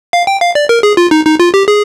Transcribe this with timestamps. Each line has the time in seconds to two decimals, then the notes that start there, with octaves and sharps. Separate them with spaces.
0.13 F5
0.27 G5
0.41 F5
0.55 D5
0.69 A#4
0.83 G#4
0.97 F4
1.11 D#4
1.25 D#4
1.40 F4
1.54 G4
1.68 G#4